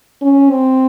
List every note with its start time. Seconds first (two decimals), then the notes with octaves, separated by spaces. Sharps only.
0.22 C#4
0.51 C4